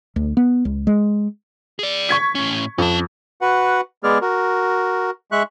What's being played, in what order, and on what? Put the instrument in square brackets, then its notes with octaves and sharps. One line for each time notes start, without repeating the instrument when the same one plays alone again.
[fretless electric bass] D2
B3
C#2
G#3
[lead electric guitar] G#4 D5
[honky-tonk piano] C#6 G#6 B6
[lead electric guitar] A2 C#4
[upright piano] F2 [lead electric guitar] C#4 A5
[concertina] F#4 B4 F#5
G#3 B3 G#4 D5 F6
F#4 A#4
G#3 E5 C#6 F#6